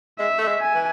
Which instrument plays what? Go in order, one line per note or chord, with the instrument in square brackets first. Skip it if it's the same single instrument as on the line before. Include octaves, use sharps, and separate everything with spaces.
[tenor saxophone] G#3 [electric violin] E5
[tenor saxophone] A3
G#3
[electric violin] G#5
[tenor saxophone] E3